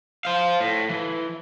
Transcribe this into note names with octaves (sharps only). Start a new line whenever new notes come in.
C5 F5
A2
E3